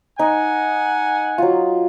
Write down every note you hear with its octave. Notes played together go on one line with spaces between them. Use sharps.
D#4 F#5 G#5
F#3 F4